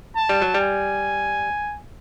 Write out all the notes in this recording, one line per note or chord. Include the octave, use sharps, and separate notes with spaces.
A5
G3
F#3
G3
G#5